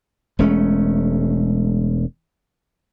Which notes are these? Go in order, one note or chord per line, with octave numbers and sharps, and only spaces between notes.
E1 G#3 A3 C#4